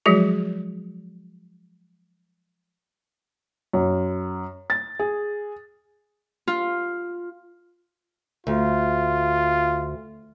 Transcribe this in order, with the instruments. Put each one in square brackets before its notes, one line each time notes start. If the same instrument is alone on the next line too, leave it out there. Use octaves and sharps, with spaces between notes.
[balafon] F3 F#3 G#3 F#4 G#4
[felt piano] F#2
A6
G#4
[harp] F4
[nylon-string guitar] D2 [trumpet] F4